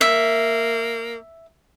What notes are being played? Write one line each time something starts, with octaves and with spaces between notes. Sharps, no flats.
A#3 E5